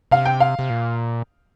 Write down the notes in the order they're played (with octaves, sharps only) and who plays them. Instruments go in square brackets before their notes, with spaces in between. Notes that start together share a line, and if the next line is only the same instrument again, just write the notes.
[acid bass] C3 [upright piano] F5
[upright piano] G5
F5
[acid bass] C3
A#2